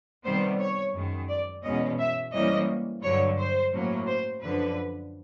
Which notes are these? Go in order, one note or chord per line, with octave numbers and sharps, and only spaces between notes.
C3 D#3 G3 B3 C5
C#5
F#2 D#3 G#3
D5
E2 B2 G#3 C#4 D#5
E5
G#2 E3 G3 A#3 C#4 D#5
G2 D3 F#3 C#5
C5
A2 F#3 A#3 C#4
C5
F#2 D3 F3 B4